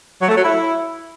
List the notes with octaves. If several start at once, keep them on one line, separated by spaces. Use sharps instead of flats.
F#3
A3
F#3
E4